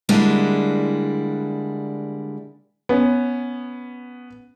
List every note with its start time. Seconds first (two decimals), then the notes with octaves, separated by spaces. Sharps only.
0.09 D3 G3 G#3 A#3 D4 E4
2.89 B3 C#4